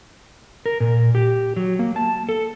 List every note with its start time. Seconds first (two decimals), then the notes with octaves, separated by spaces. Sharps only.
0.66 A#4
0.80 A#2
1.15 G4
1.56 F#3
1.79 A#3
1.96 A5
2.29 A4